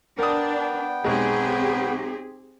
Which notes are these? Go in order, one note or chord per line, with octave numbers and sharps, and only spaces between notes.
B3 D4 A#4 G5 D#6
B1 G#3 C4 G4 G#4